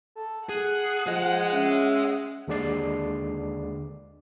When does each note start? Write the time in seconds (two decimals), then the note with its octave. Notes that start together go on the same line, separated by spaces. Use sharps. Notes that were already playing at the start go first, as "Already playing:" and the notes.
0.15 A4
0.49 G#4 F#5 F#6
1.07 F3 G#4 D#5
1.53 C#4 E5
2.48 D#2 D3 G#3 D4 D5 C7